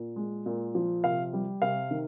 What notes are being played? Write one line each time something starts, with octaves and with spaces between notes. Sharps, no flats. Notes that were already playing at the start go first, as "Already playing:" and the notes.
Already playing: A#2
G#3
A#2
F3
C3 F5
G3
C3 F5
D#3